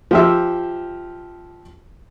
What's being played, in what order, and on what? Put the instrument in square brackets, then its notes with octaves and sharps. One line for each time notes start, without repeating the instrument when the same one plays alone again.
[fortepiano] F3 G4 E5